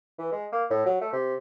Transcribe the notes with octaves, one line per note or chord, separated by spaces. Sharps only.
E3
G#3
A#3
A2
F#3
A3
C3